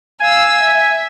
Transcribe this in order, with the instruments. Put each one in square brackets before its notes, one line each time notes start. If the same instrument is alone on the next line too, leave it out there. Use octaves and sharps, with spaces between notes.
[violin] F5 E6 [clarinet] G#5
[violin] E5